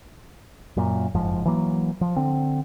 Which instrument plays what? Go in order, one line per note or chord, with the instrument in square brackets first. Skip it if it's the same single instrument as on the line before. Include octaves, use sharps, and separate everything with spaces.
[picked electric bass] F#2 A#2
F#1 F2 G#2 F3
E3 F#3 A#3
F3
D3 C4